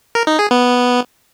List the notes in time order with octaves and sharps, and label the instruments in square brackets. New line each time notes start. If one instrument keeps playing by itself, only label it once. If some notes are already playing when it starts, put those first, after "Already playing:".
[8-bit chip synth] A#4
D#4
G#4
B3